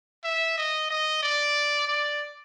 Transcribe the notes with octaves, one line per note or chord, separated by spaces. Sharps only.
E5
D#5
D#5
D5
D5